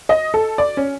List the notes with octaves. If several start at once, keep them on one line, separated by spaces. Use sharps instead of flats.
D#5
A4
D5
C#4